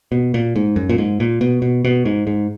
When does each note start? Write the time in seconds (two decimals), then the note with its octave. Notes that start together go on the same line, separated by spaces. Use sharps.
0.12 B2
0.34 A#2
0.56 G#2
0.76 F#2
0.89 A#2
0.98 G#2
1.20 A#2
1.41 B2
1.62 B2
1.85 B2
2.05 G#2
2.27 G#2